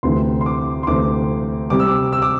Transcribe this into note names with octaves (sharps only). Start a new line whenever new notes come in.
D2 C3 E3 A3 C4 C6
C6
D6
C6
D2 C3 E3 A3 C4 D6
C3 G3 C4 D6
E6
D6
E6
D6